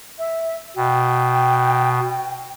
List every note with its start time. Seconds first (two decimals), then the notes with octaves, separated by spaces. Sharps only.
0.19 E5
0.76 B2 G5